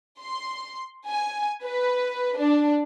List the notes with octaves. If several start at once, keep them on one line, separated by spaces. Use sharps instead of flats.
C6
G#5
B4
D4